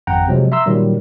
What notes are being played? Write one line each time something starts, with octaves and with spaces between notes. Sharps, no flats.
G#1 F2 F#5 G5 A#5
C3 F3 F#3 G#3
E5 A#5 C6 E6
A#2 D#3 F#3 G3